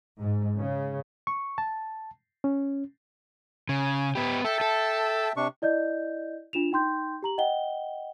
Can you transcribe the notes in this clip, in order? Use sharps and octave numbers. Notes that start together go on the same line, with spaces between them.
G#2
C#3
C#6
A5
C#4
C#3 G#5
B3 G4 B5
A4 E5 G5 A5
A4
C3 D4 C#6
E4 D5 D#5 G6
D4 F4 E7 F7
D#4 G5 C6 G6
G4 A#5 F#7
D#5 F#5 G5 G7